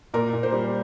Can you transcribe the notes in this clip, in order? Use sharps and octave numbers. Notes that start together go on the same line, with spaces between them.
A#2 A#4
A#2
C5
G3